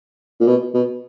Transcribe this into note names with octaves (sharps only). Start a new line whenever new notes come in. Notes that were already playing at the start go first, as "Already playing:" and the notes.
A#2
B2
B2